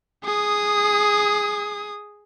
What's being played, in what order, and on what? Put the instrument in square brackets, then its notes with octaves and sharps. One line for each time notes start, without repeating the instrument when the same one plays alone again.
[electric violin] G#4 D#6